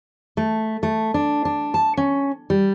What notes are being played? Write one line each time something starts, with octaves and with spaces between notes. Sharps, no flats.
A3
A3
D4
D4
A5
C#4
G3